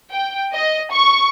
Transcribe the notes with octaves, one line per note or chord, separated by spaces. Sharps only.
G5
D#5
C#6